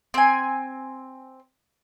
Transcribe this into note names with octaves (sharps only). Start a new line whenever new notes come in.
C4 G#5